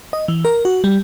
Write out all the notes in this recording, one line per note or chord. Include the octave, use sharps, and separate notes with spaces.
D#5
E3
A#4
F#4
G3